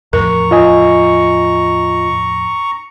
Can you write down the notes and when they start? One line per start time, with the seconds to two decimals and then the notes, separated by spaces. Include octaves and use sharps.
0.13 E2 A2 F3 A#4 A#5 C#6
0.51 F4 D#5 G#5